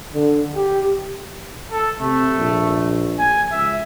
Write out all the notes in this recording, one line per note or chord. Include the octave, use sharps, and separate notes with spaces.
D3
G4
A4
C3 A3
A#1
G#5
C#2 E5